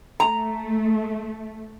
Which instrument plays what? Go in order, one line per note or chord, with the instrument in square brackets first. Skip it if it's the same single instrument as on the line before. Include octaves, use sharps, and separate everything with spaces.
[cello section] A3 [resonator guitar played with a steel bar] A#5